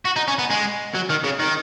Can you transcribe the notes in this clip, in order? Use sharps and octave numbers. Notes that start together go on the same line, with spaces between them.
F#4
D#4
C#4
B3
G#3
F#3
D#3
C#3
D#3